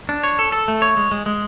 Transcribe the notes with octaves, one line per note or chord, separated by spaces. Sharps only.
D4
C#5
A4
A4
A3
C#5
G#3
G#3
G#3